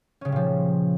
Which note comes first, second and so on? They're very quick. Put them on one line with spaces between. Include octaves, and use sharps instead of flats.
C#4 C#3 G3 A#2 F3